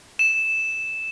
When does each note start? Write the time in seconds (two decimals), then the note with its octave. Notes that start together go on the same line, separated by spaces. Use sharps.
0.19 E7